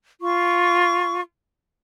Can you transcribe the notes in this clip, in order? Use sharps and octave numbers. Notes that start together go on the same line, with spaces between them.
F4 C#6